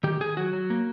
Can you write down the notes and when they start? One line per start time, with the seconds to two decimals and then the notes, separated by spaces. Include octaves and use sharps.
0.03 D#3 G4
0.20 D#3 G#4
0.37 F#3 F#4
0.53 F#3
0.70 A#3